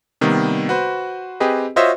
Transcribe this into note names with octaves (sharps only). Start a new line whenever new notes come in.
C3 D#3 G3 A#3 B3
F#4 B4 C5
C4 G4 G#4 B4 D#5
F4 F#4 C5 C#5 D#5 E5